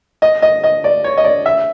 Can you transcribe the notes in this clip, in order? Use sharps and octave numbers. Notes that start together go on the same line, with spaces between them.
D#5
D#5
D#5
D5
C#5
D#5
D5
E5